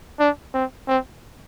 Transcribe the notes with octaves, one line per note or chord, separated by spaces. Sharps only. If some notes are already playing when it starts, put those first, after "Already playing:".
D4
C4
C4